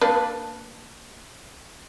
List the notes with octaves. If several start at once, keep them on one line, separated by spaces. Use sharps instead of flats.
A#3 D4 B4